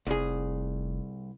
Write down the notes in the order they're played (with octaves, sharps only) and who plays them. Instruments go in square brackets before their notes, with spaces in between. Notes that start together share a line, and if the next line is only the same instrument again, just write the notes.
[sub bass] F1 [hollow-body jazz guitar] C2 G#4